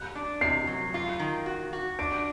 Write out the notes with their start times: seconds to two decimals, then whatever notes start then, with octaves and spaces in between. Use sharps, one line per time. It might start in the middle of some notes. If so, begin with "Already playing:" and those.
Already playing: F#6
0.15 D4
0.41 C3 C7
0.67 F#3
0.94 F4
1.20 D#3
1.46 F#4
1.73 F#4
1.99 D4 D7